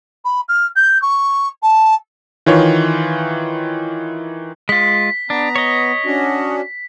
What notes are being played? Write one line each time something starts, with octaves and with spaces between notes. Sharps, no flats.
B5
F6
G6
C#6
A5
D#3 E3 F4 C#5
G#3 F4 B6
B3 D4 A#5
C#5 D#5
C#4 D4 F#4